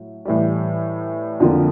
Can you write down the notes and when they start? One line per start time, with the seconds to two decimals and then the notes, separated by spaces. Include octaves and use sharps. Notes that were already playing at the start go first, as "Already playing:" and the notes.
Already playing: A2 F#3
0.25 A2 E3 G3
1.40 F2 D3 F3 A#3